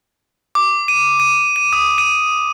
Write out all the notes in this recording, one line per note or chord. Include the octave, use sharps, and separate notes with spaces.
D6
D#7
D#7
D#7
D#6
D#7